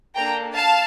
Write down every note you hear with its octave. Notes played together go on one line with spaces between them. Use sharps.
A#3 D4 A4 G5 A#5
F5 A5